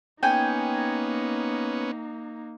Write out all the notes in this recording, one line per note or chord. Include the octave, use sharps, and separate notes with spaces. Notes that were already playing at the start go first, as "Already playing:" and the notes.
A#3 B3 C#4 D#4 G5 G#5